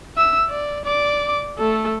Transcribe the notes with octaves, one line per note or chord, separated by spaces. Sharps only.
E5 E6
D5
D5 D6
A3 A4